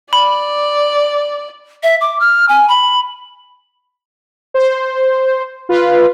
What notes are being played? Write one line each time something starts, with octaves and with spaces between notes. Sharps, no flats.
D5 B5
E5
D6
F6
G#5
B5
C5
F4 B4